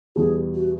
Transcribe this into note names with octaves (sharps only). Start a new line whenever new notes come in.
E2 B2 G3 G#4
F#4